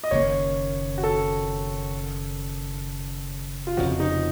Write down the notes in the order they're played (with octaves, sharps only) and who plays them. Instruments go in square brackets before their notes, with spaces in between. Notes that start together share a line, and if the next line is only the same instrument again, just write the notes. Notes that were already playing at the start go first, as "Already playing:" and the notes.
[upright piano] D#5
[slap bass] F#1 F#2 D#3 A#3 [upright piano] C#5
[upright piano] F#4
A4
F4
[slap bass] F1 F2 C#3 F3 [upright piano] F#4
[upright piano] D#4